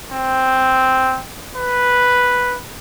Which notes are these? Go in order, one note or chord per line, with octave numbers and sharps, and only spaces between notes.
C4
B4